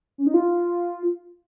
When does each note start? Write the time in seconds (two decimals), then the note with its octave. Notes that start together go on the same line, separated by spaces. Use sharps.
0.18 C#4
0.27 D#4
0.34 F4